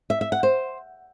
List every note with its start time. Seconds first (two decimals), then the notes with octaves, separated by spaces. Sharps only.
0.10 E5
0.21 E5
0.32 F#5
0.43 C5